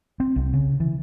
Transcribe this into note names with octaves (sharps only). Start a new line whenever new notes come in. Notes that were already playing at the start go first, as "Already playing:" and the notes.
C4
C2
C#3
E3